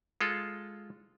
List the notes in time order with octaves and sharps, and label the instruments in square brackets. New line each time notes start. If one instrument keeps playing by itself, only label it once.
[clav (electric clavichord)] G#3 F4 A4